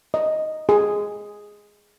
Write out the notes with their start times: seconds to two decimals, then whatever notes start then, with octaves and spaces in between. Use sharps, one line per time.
0.14 D#5
0.69 G#4